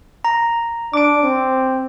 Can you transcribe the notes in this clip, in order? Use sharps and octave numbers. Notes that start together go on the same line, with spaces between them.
A#5
D4 D6 D7
C4